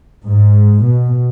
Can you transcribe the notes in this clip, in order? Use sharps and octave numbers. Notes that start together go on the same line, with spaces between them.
G#2
B2